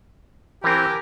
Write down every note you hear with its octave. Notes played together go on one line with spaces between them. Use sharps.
E3 C4 G4 A#4 G#5